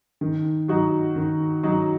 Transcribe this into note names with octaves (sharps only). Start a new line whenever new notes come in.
D#3
F#3 D#4 F#4
D#3
F#3 D#4 F#4